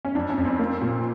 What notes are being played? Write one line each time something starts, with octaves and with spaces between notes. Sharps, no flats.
C#4
F2 D4
C#4
F2
C4
A#3
A#2